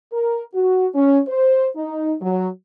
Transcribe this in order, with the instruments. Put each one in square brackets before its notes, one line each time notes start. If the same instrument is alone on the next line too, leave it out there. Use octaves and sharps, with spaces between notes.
[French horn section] A#4
F#4
C#4
C5
D#4
F#3